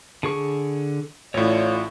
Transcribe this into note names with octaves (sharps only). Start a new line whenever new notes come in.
D3 G#4 C#6
A1 A2 A3 F4 C#5 D5